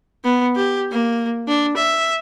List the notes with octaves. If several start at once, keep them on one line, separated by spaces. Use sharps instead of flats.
B3
G4
A#3
D4
E5